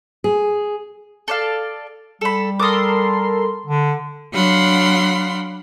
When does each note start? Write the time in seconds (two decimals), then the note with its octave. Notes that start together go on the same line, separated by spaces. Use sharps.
0.24 G#4
1.28 A4 D5 F5
2.21 G3 A4 B5
2.60 A4 A#4 C6 D6 D#6
3.67 D3
4.32 F#3 D4 F5 F#5 B5 C6